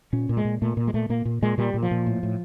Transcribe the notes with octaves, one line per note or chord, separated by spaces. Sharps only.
A#2 C#4
A#2
G#3
A#2
A#2 A3
A#2
G#3
A#2 A3
A#2 A#3
A#2
A#2 G#3
A#2 G3
A#2
F3
A#2
A2
A2